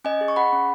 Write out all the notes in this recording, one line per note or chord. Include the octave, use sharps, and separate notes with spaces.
C#4 D#5 G#5
G#4
C#6
G#4 F#5 B5
C#4